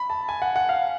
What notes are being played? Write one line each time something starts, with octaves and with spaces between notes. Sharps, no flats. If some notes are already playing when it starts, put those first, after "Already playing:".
Already playing: B5
A5
G#5
F#5
F#5
F5